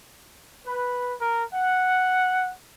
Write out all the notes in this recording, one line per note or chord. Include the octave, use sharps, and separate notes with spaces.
B4
A#4
F#5